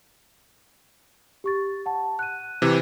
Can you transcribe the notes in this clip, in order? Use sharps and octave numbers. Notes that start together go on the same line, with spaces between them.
G4 C#6 A6
F#5 A5
F#6 D#7
C3 E3